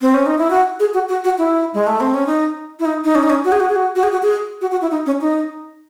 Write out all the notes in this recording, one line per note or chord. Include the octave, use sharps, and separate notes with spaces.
C4
C#4
D#4
E4
F#4
G#4
F#4
F#4
F#4
E4
G#3
A3
C4
C#4
D#4
E4
D#4
D#4
C#4
D#4
C#4
F#4
G#4
F#4
G#4
F#4
F#4
G#4
F#4
G#4
F#4
F#4
E4
D#4
C#4
D#4